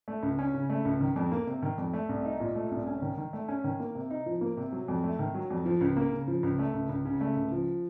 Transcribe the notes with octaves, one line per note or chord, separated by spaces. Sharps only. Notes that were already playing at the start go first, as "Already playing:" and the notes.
A3
C#2
C#4
C#3
A3
C#2
D#3
F2
A#3
C3
D#3
F2
A3
C2
D#4
A#2
A3
C2
C#4
D#3
D#3
A3
C#4
D#3
A#3
C3
D#4
F3
A#3
C3
F#3
F2
A3
D#3
F#3
F2
F3
C#2
A#3
C#3
F3
C#2
A3
C#2
C#2
C#3
A3
C#2
F3